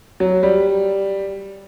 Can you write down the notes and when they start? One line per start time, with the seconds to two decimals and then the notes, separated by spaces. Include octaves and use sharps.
0.20 F#3
0.43 G3